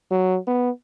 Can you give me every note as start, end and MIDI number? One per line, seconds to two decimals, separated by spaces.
0.11 0.38 54
0.47 0.70 59